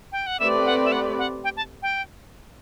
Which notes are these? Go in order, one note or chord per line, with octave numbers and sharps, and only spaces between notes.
G5
F#5
A3 C4 G4 B4 D5 E5
F#5
E5
F#5
F#5
G5
A5
G5